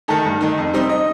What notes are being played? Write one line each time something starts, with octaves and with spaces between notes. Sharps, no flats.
D#3 A3 D#4 A4
G2
D#3 A3 D#4
F2
C3 G3 C4 D#4
D#5